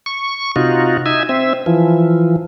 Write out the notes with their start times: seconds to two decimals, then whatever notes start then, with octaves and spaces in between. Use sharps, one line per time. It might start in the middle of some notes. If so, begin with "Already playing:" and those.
0.06 C#6
0.56 C3 D#4 F4 F#4
1.06 D#4 E5 G#5
1.29 C4 E5
1.66 E3 F3